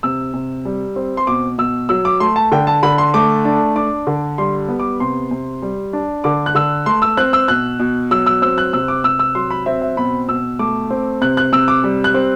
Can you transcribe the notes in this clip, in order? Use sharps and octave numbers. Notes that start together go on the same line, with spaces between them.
C3 E6
C3
G3
C4
C6
B2 D6
B2 E6
F#3 E6
D6
A3 C6
A5
D3 G5
A5
D3 B5
C6
A3 D6
D4
D4 D6
D3
G3 C6
B3
D6
C3 C6
C3
G3
D4
D3 D6
F#6
D3 E6
A3 C6
E6
C4 F#6
E6
B2 F#6
B2
F#3 E6
E6
C4 E6
F#6
C3 E6
D6
C3 E6
E6
F#3 C6
B5
C4 E5
E5
B2 B5
B2 E6
A3 D6
C4
C3 F#6
F#6
C3 E6
D6
G3
F#6
C4